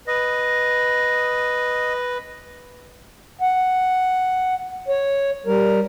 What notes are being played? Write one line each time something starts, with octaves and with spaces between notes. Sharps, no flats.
B4 D#5
F#5
C#5
G3 A#4